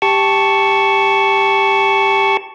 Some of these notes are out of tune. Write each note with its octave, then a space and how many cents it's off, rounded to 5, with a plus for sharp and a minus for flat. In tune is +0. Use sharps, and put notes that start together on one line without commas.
G4 +10 A5 +0 C#6 +5